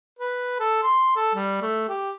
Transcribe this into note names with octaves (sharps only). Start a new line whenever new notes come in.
B4
A4
C6
A4
G3
A3
G4